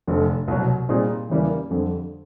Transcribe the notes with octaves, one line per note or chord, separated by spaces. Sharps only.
F1 F2 D3
C2 B2 F#3
A#2 G3 C4 D#4 G#4
E2 C#3 E3 G3 A#3
F2 D3 G3 C4